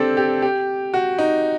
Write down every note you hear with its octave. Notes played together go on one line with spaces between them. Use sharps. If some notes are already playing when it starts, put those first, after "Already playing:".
Already playing: C4 D4 G4 A4
G4
G4
F#4
D#4